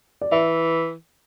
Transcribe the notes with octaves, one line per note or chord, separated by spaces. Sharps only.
D5
E3 E5